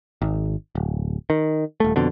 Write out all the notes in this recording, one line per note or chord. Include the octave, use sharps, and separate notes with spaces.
G#1
D1
D#3
D#1 A3
F2 B2 D3